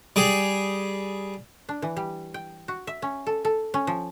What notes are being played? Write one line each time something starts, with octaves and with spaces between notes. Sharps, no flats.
G3 G#4
D4
E3
G3
G5
F#4
E5
C#4
A4
A4
C#4
F3